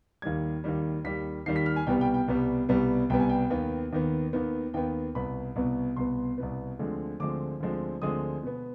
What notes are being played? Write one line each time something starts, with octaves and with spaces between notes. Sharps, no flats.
D#2 D#3 G3 G#6
D#2 D#3 G3
D#2 D#3 G3 B6
D#2 D#3 G3 C7
B6
F6
G#5
C2 B2 G3 B3 G5
G5
G5
C2 B2 G3 B3
C2 B2 G3 B3
C2 B2 G3 B3 G5
G#5
G5
D#2 D#3 B3
D#2 D#3 B3
D#2 D#3 B3
D#2 D#3 B3 G5
C2 B2 B3 B5
C2 B2 B3
C2 B2 B3 C6
C2 B2 B3
D2 D3 F3 G#3 C4
D2 D3 F3 G#3 C4 D6
D2 D3 F3 G#3 C4
D2 D3 F3 G#3 C4 D#6
B2 B3